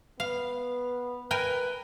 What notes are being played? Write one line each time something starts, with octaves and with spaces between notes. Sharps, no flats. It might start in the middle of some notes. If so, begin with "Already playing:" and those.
B3 F5
A#4 B4 G5 G#5